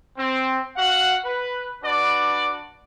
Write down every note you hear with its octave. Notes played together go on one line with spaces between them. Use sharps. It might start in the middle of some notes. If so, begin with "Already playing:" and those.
C4
F#4 F5 F#5
B4
D4 F#4 B4 D5